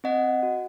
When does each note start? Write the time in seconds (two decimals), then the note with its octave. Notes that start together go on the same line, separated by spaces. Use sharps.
0.04 C4 D#5 F#5
0.43 F#4